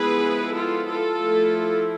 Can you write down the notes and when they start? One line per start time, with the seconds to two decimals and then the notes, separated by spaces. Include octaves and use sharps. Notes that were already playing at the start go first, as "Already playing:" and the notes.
Already playing: F3 G#3 B3 E4 G#4 B4
0.55 F4 A4
0.88 F4 A4
1.21 F3 A3 E4